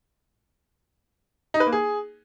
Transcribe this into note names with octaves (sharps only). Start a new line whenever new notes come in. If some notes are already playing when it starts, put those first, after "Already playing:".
D#4
B4
A#3
G#4